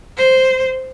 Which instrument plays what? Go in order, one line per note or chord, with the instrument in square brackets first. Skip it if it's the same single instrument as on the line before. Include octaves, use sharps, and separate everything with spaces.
[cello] C5